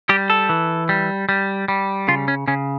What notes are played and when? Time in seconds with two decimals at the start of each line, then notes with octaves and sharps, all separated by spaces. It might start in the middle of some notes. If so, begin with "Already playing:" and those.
0.09 G3 G4
0.30 A4
0.49 E3
0.89 G3
1.29 G3
1.68 G3
2.08 C#3 F4
2.28 C#4
2.48 C#3 C#4